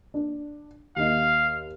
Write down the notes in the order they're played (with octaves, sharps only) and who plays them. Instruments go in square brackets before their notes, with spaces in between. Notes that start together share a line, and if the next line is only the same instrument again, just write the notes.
[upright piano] D4
[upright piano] D#2 D#4 [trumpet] F5